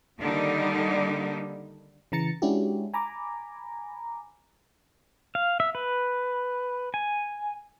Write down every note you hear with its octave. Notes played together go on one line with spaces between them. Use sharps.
D3 D#3 G3 A#3 D#4
C#3 E3 A#5 A6 C#7
G#3 C#4 D4 E4 F#4 G4
G#5 A#5 B5 D6
F5
E5
B4
G#5